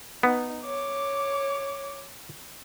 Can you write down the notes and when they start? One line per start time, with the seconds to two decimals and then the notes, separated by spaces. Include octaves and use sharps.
0.23 B3 D#4
0.64 C#5 D6